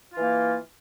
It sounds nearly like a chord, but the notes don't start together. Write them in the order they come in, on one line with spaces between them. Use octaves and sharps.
F4 E3 A#3